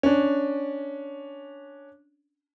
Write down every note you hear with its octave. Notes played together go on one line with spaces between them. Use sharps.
C#4 D4